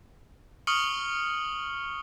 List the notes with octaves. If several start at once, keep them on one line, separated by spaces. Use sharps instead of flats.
C#6 D#6 F6 C#7 F#7 G7